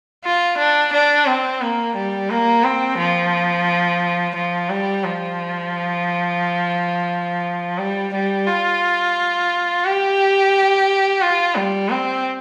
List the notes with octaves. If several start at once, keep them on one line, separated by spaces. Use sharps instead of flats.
F4
D4
D4
C4
A#3
G3
A#3
C4
F3
F3
G3
F3
G3
G3
F4
G4
F4
G3
C4